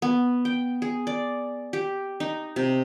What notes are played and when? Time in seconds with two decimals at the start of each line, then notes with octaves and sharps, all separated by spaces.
0.02 B3
0.45 G5
0.82 G#4
1.07 D5
1.73 G4
2.20 D#4
2.56 C3